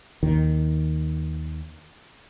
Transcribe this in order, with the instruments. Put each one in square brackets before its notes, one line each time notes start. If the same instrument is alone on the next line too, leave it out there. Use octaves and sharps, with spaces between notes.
[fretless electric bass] D#2 D#3